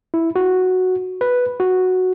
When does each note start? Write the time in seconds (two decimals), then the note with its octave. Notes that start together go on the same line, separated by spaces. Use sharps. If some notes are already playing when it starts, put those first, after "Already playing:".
0.14 E4
0.36 F#4
1.21 B4
1.60 F#4